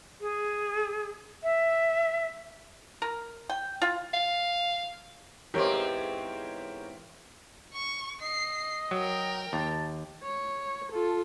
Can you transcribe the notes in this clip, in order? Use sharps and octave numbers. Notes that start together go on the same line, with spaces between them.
G#4
E5
A#4
G5
F4
F5
E2 G#2 C4 G4 A#4 C#5
C#6
D#5 C7
F#3 A#4 G5
D#2 A5
C#5
F4 A4